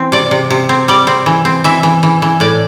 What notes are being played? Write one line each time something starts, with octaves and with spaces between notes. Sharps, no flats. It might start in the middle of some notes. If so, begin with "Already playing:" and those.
Already playing: E3 C4
C3 D5
C3
C3
C4
G3 D5
C4
E3
C4
E3 E5
E3
E3
E3
A2 D5